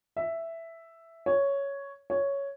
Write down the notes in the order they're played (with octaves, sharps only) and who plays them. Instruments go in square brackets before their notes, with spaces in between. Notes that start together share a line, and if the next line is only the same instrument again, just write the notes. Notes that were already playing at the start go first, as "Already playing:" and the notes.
[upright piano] E5
C#5
C#5